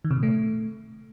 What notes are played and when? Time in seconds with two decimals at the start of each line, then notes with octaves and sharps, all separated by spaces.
0.04 D#3
0.11 C3
0.17 A#2
0.23 A3